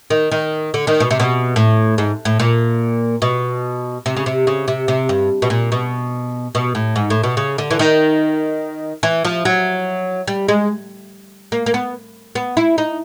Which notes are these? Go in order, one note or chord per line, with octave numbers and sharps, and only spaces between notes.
D#3
D#3
D3
D#3
B2
C3
B2
A2
G#2
A2
A#2
B2
C3
C#3
C3
C#3
C3
C3
G2
B2
A#2
B2
B2
A2
G#2
A2
B2
C#3
D3
E3
D#3
E3
F3
F#3
G3
G#3
A#3
A#3
B3
B3
E4
D#4